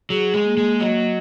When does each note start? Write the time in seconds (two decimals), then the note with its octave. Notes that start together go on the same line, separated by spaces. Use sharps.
0.10 F#3 G#4
0.34 G#3
0.45 A#3
0.57 G#3
0.80 F#3 D#5